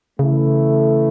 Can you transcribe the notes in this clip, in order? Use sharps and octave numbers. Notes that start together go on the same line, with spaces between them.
C#3 E3 A3 E4